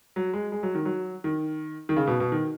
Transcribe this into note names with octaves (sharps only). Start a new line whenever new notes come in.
F#3
G#3
G#3
F#3
D#3
F#3
D#3
D#3
C#3
B2
B2
D#3